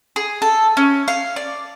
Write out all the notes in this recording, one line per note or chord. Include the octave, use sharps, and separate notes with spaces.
G#4
A4
C#4
F5
D5